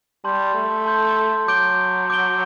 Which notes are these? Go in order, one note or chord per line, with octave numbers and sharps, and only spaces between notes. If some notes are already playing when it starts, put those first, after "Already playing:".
G3 A5 C6 G6
A3
A5 C6 G6
F#3 D6 G6 D7 G7
D6 G6 D7 G7